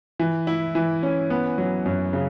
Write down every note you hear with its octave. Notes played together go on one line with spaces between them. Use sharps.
E3
E4
E3
C#4
B3
F#3
F#2
C#3